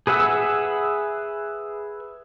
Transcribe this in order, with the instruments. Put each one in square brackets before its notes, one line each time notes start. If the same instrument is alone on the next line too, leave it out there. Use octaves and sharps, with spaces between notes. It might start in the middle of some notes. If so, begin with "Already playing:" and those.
[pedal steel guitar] G#4 B4 E5 F#5 E6